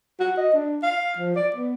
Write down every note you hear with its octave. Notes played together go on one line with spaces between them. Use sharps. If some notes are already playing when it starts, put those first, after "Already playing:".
F#4
D#5
D4
F5
F3
D5
B3